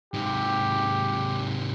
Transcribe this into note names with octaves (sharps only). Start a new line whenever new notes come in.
G#2 C3 G4